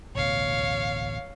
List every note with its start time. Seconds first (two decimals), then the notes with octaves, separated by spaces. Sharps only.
0.15 A1 D2 B2 C#5 F5